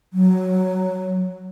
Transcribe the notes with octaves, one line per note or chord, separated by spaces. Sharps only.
F#3